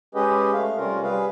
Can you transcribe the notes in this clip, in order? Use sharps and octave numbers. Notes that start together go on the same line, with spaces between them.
G#3 C#4 G4 G#4 B4 D#5
A3 F5
C3 G3 C#4 F4 A#4
G3 G#4 B4 F5